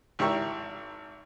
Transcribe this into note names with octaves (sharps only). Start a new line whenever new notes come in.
G#1 E4 G4 A#4 C#6